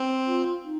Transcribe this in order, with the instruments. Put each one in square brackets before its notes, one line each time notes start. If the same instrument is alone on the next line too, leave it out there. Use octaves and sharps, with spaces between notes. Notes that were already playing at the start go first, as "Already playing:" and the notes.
Already playing: [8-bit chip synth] C4
[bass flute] F4
D#4